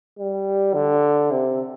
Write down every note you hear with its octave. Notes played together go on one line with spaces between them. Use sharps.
G3
D3
C3